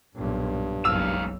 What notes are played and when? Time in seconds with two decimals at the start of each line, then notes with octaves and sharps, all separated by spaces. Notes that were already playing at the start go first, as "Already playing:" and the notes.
0.15 B1 G2 A#2
0.85 F#1 B1 G#2 F5 E6